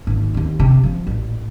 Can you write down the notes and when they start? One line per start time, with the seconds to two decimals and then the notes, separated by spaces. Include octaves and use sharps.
0.07 G#1 A#2
0.34 D#2 C4
0.60 C3
0.84 F3
1.07 A1 A#2